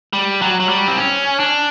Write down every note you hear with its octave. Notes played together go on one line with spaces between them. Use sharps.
G3
F#3
F#3
G3
C4
C#4
D4